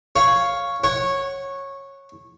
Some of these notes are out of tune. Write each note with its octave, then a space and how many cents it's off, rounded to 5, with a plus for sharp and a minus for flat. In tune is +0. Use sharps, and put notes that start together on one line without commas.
C#5 +0 F5 +0
C#5 -15 F#5 +0